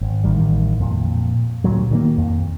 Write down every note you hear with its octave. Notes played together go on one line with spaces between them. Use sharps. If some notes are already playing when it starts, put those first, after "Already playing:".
G#1
A1 D#3 G3
F2 A#2
D2 A#2 F#3
D#3 G3 A#3
F2